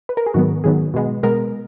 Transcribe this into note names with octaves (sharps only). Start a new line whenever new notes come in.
B4
A#4
G#4
G#2 D#3 F#3 B3 F#4
G#2 D#3 F#3 B3 G#4
B2 G#3 B3
B2 G#3 B3 A#4